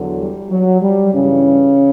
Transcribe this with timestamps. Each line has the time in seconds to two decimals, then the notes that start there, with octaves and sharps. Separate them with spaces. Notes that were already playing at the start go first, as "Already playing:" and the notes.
Already playing: E2 D3 F#3
0.18 G3
0.50 F#3
0.82 G3
1.12 G2 C#3 E3 C#4